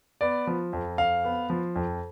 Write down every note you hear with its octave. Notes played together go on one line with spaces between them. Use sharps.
B3 D5
F3
F2
F2 F5
B3
F3
F2